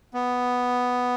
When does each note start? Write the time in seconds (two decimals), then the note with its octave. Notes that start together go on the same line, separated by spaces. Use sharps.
0.14 B3